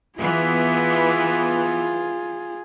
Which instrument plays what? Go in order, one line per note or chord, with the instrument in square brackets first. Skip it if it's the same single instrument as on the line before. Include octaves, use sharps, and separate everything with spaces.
[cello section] E3 B3 [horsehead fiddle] F4 G#4